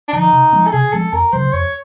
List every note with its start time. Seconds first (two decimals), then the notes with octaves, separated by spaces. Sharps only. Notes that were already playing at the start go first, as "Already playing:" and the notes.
0.08 D4
0.13 D3 F3 D#4
0.33 C3
0.53 F3 G#3 C4
0.67 A4
0.73 C3 G#4
0.93 F3 G#3 C4 A4
1.13 F2 A#4
1.33 C#3 F#3 C5
1.53 F2 C#5